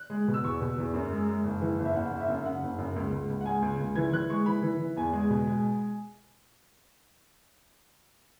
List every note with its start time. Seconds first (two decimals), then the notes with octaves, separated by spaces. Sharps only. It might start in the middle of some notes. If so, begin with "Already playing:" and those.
Already playing: F#6
0.10 G#3
0.28 B2
0.34 E6
0.43 E2 C#6
0.61 B2
0.78 E2
0.94 F#2
1.11 G#3
1.28 G#3
1.44 F#1
1.62 E3
1.79 F#1
1.85 E5
1.95 F#1 F#5
2.12 F#1
2.20 E5
2.29 F#2
2.45 C#3 F#5
2.63 F#1
2.78 F#2
2.96 C#2
3.12 C#2
3.30 C#2
3.41 F#5
3.46 G#3 G#5
3.62 C#2
3.80 C#2
3.96 E3 G#6
4.12 E3 F#6
4.29 G#3 C#6
4.46 E3 B5
4.63 E3
4.79 E3
4.96 E2 G#5
5.13 G#3
5.30 B2
5.47 G#3